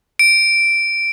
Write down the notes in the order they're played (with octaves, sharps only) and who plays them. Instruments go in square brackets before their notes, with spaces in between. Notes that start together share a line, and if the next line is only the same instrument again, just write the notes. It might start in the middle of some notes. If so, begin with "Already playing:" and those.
[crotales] D7